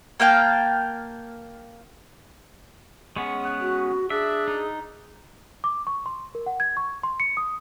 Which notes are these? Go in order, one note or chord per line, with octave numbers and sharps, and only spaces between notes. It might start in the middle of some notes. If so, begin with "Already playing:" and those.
A#3 F5 G5 A5
G#3 B3 C#4 C#6
F#5
F#4
D4 G#4 E5
D#4
D6
C#6
C6
A#4
F#5
G#6
C#6
C6
C#7
D#6